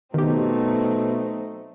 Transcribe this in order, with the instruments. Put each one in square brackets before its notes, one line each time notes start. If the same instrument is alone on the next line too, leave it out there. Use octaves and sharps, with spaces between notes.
[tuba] B2 [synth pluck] D#3 G4 [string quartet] F#3 C4 D#4 [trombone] A3